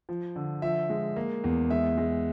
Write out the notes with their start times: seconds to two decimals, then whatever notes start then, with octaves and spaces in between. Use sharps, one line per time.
0.09 F3
0.36 D3
0.62 F3 E5
0.89 G#3
1.16 A#3
1.44 E2
1.70 G#3 E5
1.97 G#3